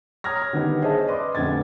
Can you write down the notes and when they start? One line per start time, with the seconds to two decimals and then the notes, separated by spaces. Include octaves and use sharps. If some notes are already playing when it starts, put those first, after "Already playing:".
0.24 C#5 A#5 D#6 F6 G#6 A#6
0.42 G#6
0.53 D3 D#3 G3 B3 D#4
0.82 G#4 C5 C#5 D#5 E5 A5
1.07 B4 D5 D#5 C6 D6
1.35 F1 A#1 D3 B4 G#6 A6